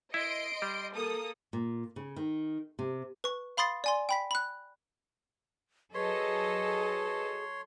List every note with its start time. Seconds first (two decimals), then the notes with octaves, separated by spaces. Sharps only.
0.14 E4 D#5 C6 D7
0.62 G3
0.94 A#3 A4 D#6
1.53 A#2
1.96 C#3
2.16 D#3
2.79 C3
3.24 B4 C#6
3.57 F5 B5 C6 D#6 A6 C7
3.84 D5 G#5 C6
4.09 G5 B5 B6
4.31 B5 F#6
5.95 F#3 G#4 A4 B4 C#5 D#5 C6